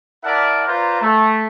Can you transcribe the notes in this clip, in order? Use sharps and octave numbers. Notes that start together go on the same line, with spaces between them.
E4 A#4 D5 E5 F#5 A5
F4 B4 C5 D5 A#5
A3